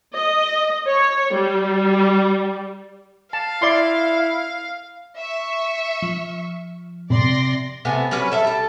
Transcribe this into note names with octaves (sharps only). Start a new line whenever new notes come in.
D#5
C#5
G3
F5 A5
E4 D5 C6
E5 C#6
F3
C3 D5 C6 A#6
C3 A3 B3 G#5
F#3 G3 C#4 B4
A4 E5
G3 A4